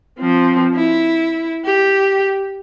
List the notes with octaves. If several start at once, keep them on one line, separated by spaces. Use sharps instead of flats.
F3 C4
E4
G4